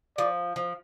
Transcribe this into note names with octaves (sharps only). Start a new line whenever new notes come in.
F3 D5
F3